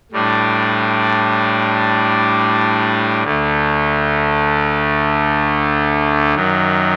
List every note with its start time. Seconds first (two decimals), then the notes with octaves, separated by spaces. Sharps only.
0.12 A2 G3 D4
3.23 D2 D3 A3
6.35 F#2 D#3 F#3